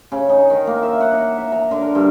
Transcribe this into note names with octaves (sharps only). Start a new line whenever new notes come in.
C#3
D#4
D#3
A#3
E5
F#5
D#4
E5
A#5
D3
A#4
G2